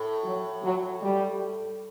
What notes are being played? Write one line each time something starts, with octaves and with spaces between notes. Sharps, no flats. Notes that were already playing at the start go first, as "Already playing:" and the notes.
Already playing: A2
F#3
F#3
G3